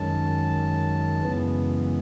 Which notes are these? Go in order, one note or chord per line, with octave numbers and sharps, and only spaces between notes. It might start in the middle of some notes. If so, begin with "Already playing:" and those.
Already playing: F#2 D#3 G#3 C#4 A5
F#2 C#3 E3 G#3 B3